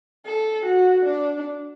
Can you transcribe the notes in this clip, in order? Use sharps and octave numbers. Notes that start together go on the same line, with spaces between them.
A4
F#4
D4